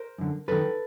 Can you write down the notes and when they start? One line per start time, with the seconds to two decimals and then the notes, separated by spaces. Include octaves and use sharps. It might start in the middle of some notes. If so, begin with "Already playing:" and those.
Already playing: A#4 C5
0.18 F#2 D3
0.48 F#2 D#3 A4 B4